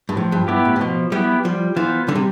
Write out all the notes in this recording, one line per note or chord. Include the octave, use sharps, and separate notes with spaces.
G2
A2 F3
G2
G2 B3 E4 G4
A2
A2
B2 F3
G3 B3 E4 G4
F3 G3
E3 B3 F4 C5
D3 G3
C3